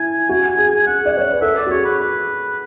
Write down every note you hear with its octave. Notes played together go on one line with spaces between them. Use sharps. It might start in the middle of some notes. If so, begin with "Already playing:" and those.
Already playing: E4 G#5
F#4
G#4
G#4 F#5
D5
C#5
B4
A4 E5
D5
F#4
G#4 C#5
B4
B4